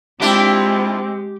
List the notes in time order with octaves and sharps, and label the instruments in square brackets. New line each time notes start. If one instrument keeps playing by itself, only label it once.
[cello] G#3 [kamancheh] C4 [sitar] D4 E4 F4 [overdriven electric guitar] G4